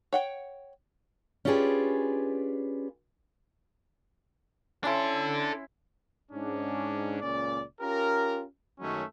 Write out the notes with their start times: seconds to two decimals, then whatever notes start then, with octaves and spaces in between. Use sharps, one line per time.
0.13 C#5 F#5 G5
1.45 C#4 D4 F4 G4 G#4 B4
4.84 C#4 D4 E4 A4 C6
6.31 G#2 C#4 D4
7.21 C#2 A#2 C#4 D5
7.80 C#4 F4 G4 A#4
8.80 F#2 D#3 F#3 G#3 A3 C#4